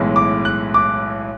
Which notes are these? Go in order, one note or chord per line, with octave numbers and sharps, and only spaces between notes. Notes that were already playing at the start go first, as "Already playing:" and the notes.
Already playing: B1 A2 E3 G#3
D6
F#6
D6